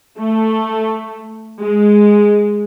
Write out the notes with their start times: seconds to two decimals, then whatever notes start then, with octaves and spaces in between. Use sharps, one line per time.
0.17 A3
1.60 G#3